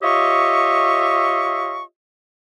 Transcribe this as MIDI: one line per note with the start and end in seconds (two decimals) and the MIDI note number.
0.02 1.82 65
0.02 1.82 67
0.02 1.82 73
0.02 1.82 75
0.02 1.82 76
0.02 1.82 85